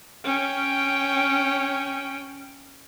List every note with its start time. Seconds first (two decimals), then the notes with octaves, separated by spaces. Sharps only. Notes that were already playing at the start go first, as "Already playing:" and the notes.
0.24 C#4 G5